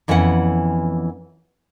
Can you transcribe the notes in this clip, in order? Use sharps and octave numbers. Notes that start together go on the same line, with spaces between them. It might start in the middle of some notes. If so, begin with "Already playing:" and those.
F2 E3 B3 C#4 B4 F#5